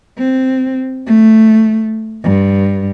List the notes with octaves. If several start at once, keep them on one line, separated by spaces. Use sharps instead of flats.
C4
A3
G2